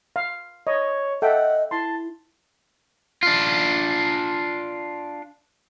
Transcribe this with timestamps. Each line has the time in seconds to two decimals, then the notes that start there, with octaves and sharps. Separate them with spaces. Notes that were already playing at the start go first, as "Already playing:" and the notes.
0.16 F5
0.67 C#5 D#5
1.22 A4 D#5 E5 F#5 G5
1.71 E4 A5 C6
3.23 D4 F4